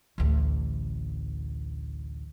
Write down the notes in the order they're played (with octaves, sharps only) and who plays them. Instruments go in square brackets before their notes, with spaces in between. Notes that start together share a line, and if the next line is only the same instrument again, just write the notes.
[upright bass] A1 D2